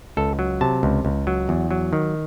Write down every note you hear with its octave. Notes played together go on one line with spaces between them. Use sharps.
C#2 A4
F#3
C3 A5
C#2
C#2
F#3
E2
F#3
D#3